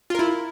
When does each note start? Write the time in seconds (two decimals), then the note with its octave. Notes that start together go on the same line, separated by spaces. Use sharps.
0.10 F4
0.15 A#4
0.19 E4